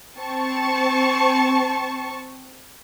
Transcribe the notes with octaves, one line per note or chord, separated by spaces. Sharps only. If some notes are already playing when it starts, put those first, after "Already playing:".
C4 A5 C#6